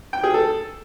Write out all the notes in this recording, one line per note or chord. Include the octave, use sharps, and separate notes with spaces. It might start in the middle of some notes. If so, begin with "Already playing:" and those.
G5
G#4
A4